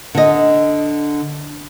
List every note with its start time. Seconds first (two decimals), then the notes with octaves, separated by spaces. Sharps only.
0.15 D3 D#5